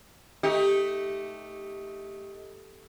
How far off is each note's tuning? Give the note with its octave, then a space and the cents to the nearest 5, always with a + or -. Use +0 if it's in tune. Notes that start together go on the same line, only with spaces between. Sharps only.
A3 +0 D#4 +15 G4 +10